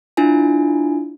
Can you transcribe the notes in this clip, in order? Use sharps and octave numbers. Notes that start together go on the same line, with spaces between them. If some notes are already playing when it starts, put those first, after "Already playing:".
D4 E4 F4 G#5